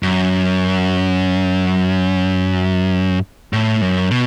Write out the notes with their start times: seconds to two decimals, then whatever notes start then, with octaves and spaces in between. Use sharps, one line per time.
0.03 F#2
3.53 A2
3.81 F#2
4.11 B2